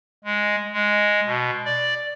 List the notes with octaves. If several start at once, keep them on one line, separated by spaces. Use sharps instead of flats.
G#3
G#3
B2
D5